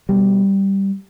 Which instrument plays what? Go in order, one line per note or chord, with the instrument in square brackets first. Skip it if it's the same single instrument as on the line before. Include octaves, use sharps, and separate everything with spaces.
[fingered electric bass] B2 G3